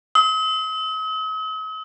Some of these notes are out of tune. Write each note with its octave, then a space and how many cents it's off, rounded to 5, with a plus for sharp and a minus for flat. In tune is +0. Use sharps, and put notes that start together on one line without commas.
D#6 +45